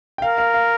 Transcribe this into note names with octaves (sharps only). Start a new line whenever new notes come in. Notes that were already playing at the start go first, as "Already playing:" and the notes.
G5
A#4 F5
F5
F5